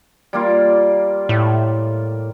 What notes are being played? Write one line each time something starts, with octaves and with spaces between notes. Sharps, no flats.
G3 A#3 F4
A2